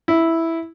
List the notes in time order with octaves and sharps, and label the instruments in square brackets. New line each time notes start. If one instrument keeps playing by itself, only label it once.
[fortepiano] E4